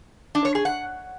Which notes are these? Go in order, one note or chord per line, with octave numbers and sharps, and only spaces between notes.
D4
C#5
G#4
F#5